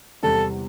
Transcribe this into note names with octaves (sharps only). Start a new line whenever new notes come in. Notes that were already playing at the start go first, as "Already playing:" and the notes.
E2 C3 G3 A4